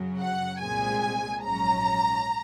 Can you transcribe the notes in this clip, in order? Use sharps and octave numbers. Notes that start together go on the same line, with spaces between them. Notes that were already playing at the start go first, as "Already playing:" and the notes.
Already playing: F#2 C#3 F#3
F#5
C2 A#2 G#3 C4 G#5
A#1 G#2 F#3 C#4 A#5